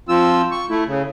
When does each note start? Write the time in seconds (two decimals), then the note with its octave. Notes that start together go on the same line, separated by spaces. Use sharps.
0.09 F3 C4 F4 E6
0.51 C#6
0.70 A3 E4
0.87 C#3